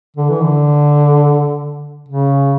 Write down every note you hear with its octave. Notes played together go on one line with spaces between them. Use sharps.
D3
E3
D3
C#3